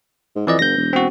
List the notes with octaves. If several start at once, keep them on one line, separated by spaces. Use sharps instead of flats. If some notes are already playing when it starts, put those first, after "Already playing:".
G#2
F2 E3 D5 D#5
F#1 G6 A#6
E1
C4 F#4